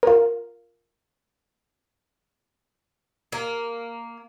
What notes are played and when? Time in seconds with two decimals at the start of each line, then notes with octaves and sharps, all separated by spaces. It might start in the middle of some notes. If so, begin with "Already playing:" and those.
0.03 F4 A#4
3.32 A#3